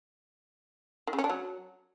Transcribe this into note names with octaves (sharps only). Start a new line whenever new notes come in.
D#3
C#3
C#4
D4
F#3